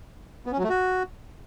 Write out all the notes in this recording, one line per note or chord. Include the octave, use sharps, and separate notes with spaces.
B3
C#4
F#3
A3
F#4